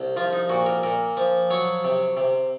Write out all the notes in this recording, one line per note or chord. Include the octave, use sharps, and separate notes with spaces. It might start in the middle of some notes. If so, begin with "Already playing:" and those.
Already playing: C2
F3 F4
D#4
A#2 F#4
A#4
A#2 A#4
F3
F#3 C#5
C3
C3